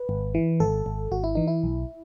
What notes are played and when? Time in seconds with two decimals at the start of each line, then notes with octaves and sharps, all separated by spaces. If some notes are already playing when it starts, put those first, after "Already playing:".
Already playing: B4
0.09 G#1
0.35 E3
0.60 G#1 A4
0.86 G#1
1.11 G#1 F#4
1.24 E4
1.35 E3 D#4
1.47 E4
1.63 B1